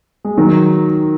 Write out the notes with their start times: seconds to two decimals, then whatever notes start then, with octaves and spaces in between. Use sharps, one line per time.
0.24 G#3
0.38 D#3 F#3